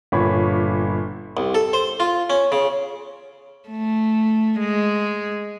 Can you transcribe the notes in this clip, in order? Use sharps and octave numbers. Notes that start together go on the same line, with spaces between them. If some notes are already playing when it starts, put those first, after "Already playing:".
G1 A#2 C#5 B5 C#6
C2
A4
C5
F4
C#4
C#3
A3
G#3